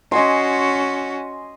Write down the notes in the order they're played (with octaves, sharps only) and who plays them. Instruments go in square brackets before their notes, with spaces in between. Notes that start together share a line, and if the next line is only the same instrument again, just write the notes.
[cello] C#4 F#4 [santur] D#5 G#5 C6